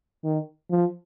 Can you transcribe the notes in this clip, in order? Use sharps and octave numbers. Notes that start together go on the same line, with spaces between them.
D#3
F3